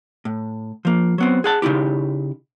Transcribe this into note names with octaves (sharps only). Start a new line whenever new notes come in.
A2
F3 A#3
F#3 B3 C4
G#4 F#5 A5
C#3 D#4 E4 G4